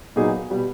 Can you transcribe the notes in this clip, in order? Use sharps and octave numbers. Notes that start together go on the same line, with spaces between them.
A#2 F#3 B3 D#4 G#4
B2 G3 B3